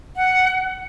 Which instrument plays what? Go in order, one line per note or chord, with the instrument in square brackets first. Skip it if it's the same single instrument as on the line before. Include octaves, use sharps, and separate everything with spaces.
[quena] F#5